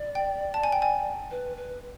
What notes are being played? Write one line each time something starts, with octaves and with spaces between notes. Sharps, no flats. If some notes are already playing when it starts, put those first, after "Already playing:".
Already playing: D5
G5
A5
G#5
G5
G#5
B4
B4